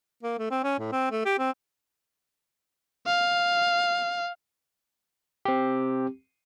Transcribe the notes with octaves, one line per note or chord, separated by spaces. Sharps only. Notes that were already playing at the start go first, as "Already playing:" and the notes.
A#3
A3
C4
C#4
A2
C4
A3
G4
C4
F5
C4 G4